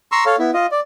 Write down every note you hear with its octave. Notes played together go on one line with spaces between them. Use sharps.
A#5 C6 C#6 E6
A4 C#5 F5
B3 E4
F4 D#5
D5